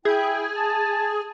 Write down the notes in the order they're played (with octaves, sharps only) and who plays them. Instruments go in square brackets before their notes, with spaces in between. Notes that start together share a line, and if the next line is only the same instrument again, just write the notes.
[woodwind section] E4 E5 G5 [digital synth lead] G#4
[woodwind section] A5